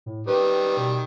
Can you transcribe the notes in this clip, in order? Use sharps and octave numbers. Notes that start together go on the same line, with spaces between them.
A2
D#3 G3 B4
B2